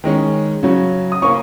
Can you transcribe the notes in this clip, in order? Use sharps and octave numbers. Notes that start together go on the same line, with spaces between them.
D#3 G#3 C#4
C#3 F#3 C#4
D#6
C#3 A#3 C#4 C#6